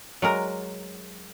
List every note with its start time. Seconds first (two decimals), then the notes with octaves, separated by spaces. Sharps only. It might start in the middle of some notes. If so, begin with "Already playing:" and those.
0.22 F#3 G#3 A#4